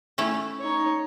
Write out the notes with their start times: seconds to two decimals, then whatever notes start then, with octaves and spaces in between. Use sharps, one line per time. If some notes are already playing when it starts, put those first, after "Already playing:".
0.18 A3 C#4 E4
0.60 D#4 C#5